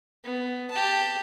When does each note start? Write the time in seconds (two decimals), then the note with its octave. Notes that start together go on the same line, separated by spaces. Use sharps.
0.24 B3
0.71 G4 A5